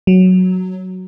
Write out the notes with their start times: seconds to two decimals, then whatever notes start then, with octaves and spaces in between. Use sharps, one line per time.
0.07 F#3